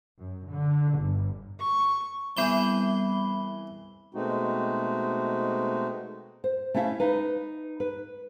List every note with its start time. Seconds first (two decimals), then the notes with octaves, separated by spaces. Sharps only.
0.19 F#2
0.51 D3
0.99 G1
1.60 C#6
2.37 C2 E3 B3 G#4 B5 G7
4.14 B2 G#3 A3 C4 D#4 F#4
6.44 C5
6.74 A3 C#4 E4 E5 F5
7.00 D#4 B4
7.80 B4